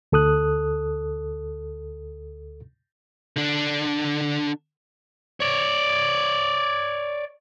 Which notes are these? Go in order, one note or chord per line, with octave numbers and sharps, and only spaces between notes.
D2 A4 D#6 F#6
D3 D4
C#5 D5